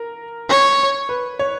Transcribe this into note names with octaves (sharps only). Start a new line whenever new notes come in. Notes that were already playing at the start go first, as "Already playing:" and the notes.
Already playing: A#4
C#5
B4
C#5